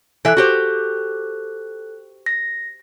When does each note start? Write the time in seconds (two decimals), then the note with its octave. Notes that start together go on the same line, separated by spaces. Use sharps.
0.25 E3 A4 E5 F#6
0.37 F#4 G4 C5
2.26 A#6